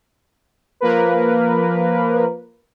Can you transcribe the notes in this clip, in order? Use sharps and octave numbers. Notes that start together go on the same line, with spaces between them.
F3 A#3 A#4 B4